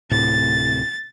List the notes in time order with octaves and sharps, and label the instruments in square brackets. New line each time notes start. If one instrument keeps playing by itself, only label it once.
[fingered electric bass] D1 A2 C3 [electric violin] A6